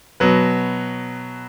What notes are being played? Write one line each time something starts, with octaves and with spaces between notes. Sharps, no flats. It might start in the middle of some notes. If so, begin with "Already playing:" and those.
B2 F#3 B4